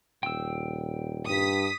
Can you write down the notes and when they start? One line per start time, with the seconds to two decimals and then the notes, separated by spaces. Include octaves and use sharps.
0.23 D#1 G5 E6
1.27 G2 D#6 B6